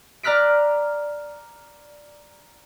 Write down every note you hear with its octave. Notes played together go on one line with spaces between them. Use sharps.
D5 A#5 F6 F#6 B6 D7